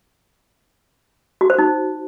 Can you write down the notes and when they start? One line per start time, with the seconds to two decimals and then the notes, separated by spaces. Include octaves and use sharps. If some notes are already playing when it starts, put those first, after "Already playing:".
1.41 F#4
1.50 C5
1.59 D#4